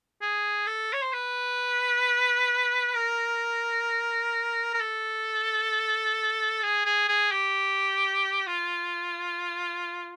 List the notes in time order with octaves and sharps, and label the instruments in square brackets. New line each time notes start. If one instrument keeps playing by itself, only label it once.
[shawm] G#4
A4
C#5
C5
B4
A#4
A#4
A4
G#4
G#4
G#4
G4
F4